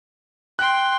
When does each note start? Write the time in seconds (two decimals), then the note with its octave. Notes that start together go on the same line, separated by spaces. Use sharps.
0.59 G5 C6 F#6